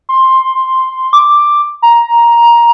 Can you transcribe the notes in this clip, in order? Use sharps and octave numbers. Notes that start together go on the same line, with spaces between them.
C6
D6
A#5